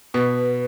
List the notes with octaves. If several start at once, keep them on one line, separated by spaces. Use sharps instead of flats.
B2 B4